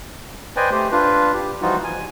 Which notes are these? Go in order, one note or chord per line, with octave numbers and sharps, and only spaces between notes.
B4 C5 D5 D#5 G5 G#5
A3 G4 C5
D4 F4 B4
G4
E3 F3 G3 D#4 F4 F#4
G#5